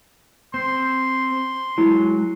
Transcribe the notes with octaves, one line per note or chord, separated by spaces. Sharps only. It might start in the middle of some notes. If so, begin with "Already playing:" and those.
C4 C6
F#3 G#3 E4